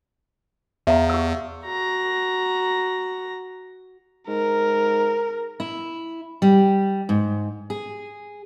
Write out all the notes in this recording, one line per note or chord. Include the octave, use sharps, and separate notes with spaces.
E2 E5 F5 A#5
G4 E6
F#4 A#5
G#2 A#4
E4
G3
G#2
G#4